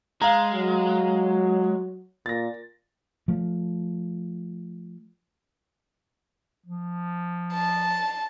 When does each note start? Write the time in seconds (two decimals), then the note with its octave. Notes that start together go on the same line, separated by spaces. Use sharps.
0.22 G#3 F5 A#5
0.52 F#3
2.26 A#2 A6 A#6
3.28 F3 A3
6.66 F3
7.53 A5